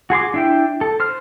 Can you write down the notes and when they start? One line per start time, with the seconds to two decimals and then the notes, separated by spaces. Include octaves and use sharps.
0.10 F#4 G#4 C6 D6
0.34 D4 E4 G5
0.81 A4
1.00 C5 F6